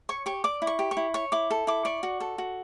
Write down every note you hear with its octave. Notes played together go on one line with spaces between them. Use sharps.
C#5 C#6
G4 C#6
D5 D6
E4
C#6
G4
C#6
E4
C#5 C#6
E4 D6
A4
E4 D6
D5 C#6
F#4
A4
F#4